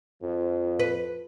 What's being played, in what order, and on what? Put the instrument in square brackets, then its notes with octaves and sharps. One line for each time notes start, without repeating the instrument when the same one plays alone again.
[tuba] F2 [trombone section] F3
[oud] B4